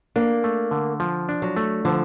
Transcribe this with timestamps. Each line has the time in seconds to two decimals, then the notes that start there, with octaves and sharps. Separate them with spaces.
0.16 A#3 D4
0.44 A3
0.71 D3
1.00 F3
1.29 D4
1.42 F#3
1.57 A3
1.85 D3 F3